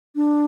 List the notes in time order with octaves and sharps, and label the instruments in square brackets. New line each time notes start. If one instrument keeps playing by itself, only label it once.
[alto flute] D4